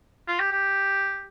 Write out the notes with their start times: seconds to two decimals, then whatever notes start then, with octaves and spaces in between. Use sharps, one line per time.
0.28 F4
0.40 G4
0.52 G4